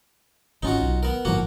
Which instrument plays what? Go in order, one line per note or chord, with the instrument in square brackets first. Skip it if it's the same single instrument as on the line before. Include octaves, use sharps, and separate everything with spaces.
[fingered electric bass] G#1 C#4 [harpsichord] D#4 F4 F#4
[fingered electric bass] B1
[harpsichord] B3 A#4
[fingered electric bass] G1 A2 F3 [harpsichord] A#3 F#4